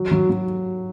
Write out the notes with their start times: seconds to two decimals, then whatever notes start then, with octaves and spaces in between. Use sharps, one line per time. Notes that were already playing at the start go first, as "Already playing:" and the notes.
Already playing: F#3
0.11 F#3
0.30 F#3